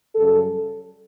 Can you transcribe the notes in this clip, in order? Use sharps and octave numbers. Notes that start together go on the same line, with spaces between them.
F#2 C#3 G3 A4